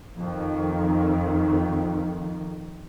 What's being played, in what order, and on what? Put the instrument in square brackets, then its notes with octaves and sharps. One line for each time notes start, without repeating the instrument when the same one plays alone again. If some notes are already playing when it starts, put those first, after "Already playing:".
[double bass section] F2 D#3